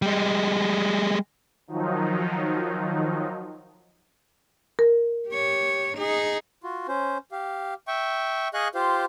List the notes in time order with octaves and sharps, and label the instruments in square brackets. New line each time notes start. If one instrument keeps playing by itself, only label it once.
[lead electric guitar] G3 G#3
[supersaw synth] D#3 F3 F#3 D#4
[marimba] A#4
[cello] G4 C#5
D#4 G#4
[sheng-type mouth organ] F4 F#4
C#4 C5
G4 F5
E5 G5 C#6
G#4 D#5 F5 C#6 F#6
F4 G4 C5 F5